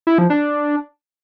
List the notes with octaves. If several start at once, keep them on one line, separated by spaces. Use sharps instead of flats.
E4
F3
D4